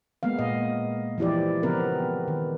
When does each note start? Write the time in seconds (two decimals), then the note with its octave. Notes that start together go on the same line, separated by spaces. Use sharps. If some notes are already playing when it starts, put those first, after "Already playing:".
0.23 G#3 A#3 B3 F5
0.39 A#2 D#5
1.18 E3 F3 E4 G4 D5
1.63 C#3 F3 B3 C4 A#4 B4
2.28 D#3